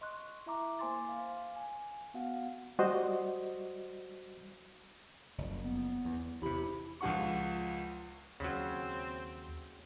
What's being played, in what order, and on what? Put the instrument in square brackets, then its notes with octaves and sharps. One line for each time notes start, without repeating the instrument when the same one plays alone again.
[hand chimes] D#5 C6 C#6 F#6
E4 E5 A#5 D6
A#3 C5 G#5 C6 D6 A6
F5
G#5
B3 F#4 F5 F#5
[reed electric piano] G3 F#4 C5 D5 D#5
[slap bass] F#1 F2
[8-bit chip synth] B3
[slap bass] E2
[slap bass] E2 C3 [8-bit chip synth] E4 G4 B5
[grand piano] C#2 F3 F4 F#5 C#6
[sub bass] D#2 [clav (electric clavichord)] C#3 F#3 [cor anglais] C4